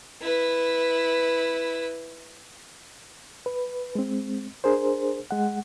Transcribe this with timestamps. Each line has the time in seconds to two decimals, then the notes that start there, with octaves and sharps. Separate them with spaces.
0.22 E4 B4
3.46 B4
3.95 G#3 C4
4.64 D4 G#4 A#4 C5
5.31 G#3 F#5